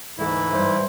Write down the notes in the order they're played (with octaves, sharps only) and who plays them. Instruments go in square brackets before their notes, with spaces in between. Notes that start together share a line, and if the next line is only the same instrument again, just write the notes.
[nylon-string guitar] D2 A4 [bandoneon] G#2 E3 E4
[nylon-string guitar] G2 E5 [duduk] C5